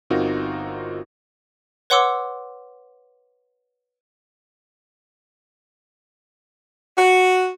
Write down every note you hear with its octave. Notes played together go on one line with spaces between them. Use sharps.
G1 C4 D#4 F4 F#4 A#4
B4 C#5 F#5 C6 D6 E6
F#4